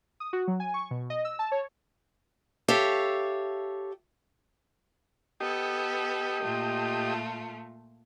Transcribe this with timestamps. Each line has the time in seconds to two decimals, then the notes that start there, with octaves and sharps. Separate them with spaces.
0.20 D#6
0.33 F#4
0.47 F#3
0.60 G#5
0.74 C#6
0.91 B2
1.10 D#5
1.25 E6
1.39 A5
1.52 C#5
2.68 G4 A4 C#5 E5 F5
5.40 B3 G4 A4 D#5
6.44 A#2 A3 F4